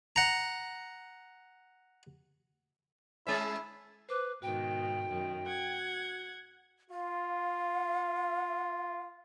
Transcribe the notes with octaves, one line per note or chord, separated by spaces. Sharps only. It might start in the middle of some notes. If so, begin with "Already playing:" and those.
F#5 A#5
G#3 C#4 E4 E5
B4 C5 D6
G#2 B2 D#3 F#4 G5
F#2 D#3
F#5 G#6
F4 F5